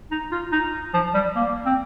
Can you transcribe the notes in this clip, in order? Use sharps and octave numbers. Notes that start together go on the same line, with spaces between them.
D#4
F4
D#4
F3
G3
A#3
C4